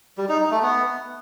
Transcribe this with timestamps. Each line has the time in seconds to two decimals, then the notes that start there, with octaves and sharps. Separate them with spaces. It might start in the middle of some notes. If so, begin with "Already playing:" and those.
0.18 G3
0.29 D#4
0.40 D#4
0.51 A3
0.62 B3